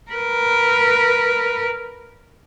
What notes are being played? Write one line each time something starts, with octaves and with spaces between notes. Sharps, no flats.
A#4 B4